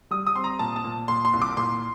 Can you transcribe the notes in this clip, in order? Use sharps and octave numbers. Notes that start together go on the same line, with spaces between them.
G3 D#6
D#6
C4 C6
A#5
A#2 A5
A5
A#2
A#2 C6
C6
C2
D6
A#2 C6